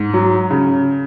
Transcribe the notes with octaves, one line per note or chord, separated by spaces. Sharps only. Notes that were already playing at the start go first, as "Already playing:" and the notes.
Already playing: G#2
F#3
C#3